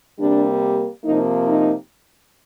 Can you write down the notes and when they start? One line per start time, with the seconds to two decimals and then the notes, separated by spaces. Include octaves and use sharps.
0.18 C3 G3 A#3 D4
1.04 C3 F3 A#3 D#4
1.47 D#4